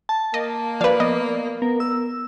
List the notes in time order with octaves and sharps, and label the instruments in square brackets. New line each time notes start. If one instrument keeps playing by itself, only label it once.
[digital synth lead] A5
[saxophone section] A#3 [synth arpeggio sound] D#5
[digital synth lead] F3 [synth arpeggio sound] B4 F5 [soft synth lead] D5
[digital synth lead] B3 [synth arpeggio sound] D#5
[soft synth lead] B3 [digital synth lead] A#4
[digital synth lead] E6